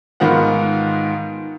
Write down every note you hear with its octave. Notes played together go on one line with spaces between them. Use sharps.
G#2 D#3 B3 F4 F#5